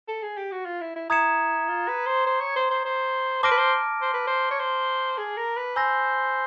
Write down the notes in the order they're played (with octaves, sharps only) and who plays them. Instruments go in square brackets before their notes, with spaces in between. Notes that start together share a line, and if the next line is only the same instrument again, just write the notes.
[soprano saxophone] A4
G#4
G4
F#4
F4
E4
E4
[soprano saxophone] E4 [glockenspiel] A#5 D#6 G#6 C#7 E7
[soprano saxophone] F4
B4
C5
C5
C#5
C5
C5
C5
[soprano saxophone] C5 [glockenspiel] A5 D6 F6 A#6 D7
[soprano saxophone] B4
C5
C5
B4
C5
C#5
C5
G#4
A#4
B4
[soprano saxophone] C5 [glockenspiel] G#5 B5 E6 G6 A#6